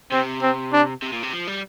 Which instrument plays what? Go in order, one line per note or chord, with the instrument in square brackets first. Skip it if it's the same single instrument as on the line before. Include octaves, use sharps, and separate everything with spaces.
[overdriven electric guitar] C3 [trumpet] C4
[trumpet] C4
D4
[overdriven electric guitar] C3
A#2
C3
F3
G3